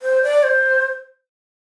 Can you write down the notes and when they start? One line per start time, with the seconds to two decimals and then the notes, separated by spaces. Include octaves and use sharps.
0.02 C5
0.23 D5
0.43 C5